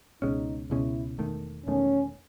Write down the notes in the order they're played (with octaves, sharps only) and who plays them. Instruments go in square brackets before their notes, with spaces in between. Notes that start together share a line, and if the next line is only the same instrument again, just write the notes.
[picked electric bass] C#2 B2 G#3 C#4 [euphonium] D#4
[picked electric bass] C#2 B2 G#3 C#4 [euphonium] E4
[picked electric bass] E1 E2 D#3 A3
[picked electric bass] E1 E2 D#3 A3 [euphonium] C#4